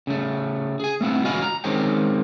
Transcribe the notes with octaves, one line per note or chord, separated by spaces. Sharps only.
C#3 A3
G#4 G#5
A3 B3 C4 E4
C#2 F#4 D#5 F5 G#5 B5
A#5
D#3 G#3 C4 C#4 G4